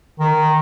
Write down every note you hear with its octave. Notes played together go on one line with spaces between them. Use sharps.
D#3